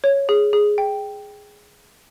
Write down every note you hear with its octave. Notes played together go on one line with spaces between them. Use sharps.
C#5
G#4
G#4
G5